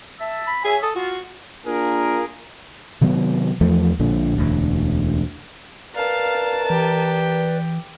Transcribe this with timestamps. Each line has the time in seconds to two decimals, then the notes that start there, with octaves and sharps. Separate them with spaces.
0.21 E5 A5 E6
0.47 B5
0.64 G#4 C#5 E5 G#5
0.83 A4 D#6
0.96 F4 F#4
1.66 A#3 D4 F4 G#4 A#4
3.01 C3 D#3 F#3 B3
3.61 E2 F3 A3
3.99 A#1 A#2 D3
4.38 E1 D2
5.95 A#4 B4 D5 F5 A5
6.70 E3 G4